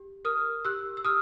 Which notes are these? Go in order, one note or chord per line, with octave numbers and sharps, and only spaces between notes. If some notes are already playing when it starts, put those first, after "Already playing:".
Already playing: G4
A#4 D#6 F6
G4 E6 F#6
E6
G4 D#6 F6